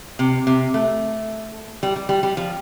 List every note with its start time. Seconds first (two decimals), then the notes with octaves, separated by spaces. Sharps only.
0.19 C3
0.47 C3
0.74 A3
1.83 G3
1.96 G3
2.09 G3
2.23 G3
2.37 F3